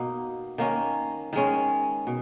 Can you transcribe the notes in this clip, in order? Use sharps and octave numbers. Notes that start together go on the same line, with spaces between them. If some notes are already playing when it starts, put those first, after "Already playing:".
Already playing: B2 A#3 D#4
D#3 A#3 C#4
D#3 G#3 C#4
B2